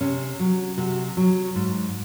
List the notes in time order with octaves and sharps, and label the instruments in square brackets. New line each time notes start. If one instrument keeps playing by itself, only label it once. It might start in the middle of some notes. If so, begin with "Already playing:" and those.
[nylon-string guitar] C3 C#4
F#3
C3 F#4
F#3
G#2